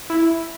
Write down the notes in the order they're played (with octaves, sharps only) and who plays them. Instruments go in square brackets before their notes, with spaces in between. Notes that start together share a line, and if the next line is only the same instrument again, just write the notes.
[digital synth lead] E4